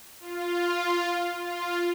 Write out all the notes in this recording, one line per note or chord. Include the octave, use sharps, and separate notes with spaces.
F4
F4